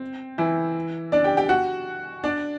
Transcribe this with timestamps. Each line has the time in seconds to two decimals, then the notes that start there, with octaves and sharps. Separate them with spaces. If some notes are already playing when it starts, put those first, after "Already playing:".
Already playing: C4
0.38 E3 E4
1.12 D4 D5
1.24 G4 G5
1.37 G4 G5
1.49 F#4 F#5
2.24 D4 D5